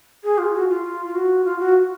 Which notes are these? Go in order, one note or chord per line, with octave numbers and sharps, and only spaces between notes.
G#4
F4
F#4
F4
F4
F4
F#4
F4
F#4